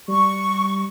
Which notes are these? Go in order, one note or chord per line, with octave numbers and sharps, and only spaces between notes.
G3 C#6